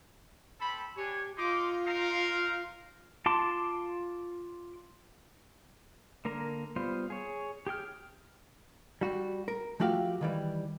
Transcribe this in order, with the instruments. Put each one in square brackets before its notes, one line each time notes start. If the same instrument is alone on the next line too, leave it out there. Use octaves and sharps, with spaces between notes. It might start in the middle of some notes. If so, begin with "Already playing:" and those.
[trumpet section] C4 A4 B5
[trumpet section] D4 C#5 G#5 [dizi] G4
[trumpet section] D#4 C6 D6 [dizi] F4
[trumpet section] D#4 A#4 F5
[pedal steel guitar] F4 A5 C6 D6
D3 A#3 A#4 A#5
G3 B3 F4 C5
G#4 C#5
G4 G#4 G5 F6
[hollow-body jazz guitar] G3 F#4
A#4
F3 A3 F#4 G4 F5
D#3 E3 G3